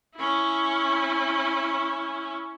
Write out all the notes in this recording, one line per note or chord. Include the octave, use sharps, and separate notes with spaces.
C#4 E4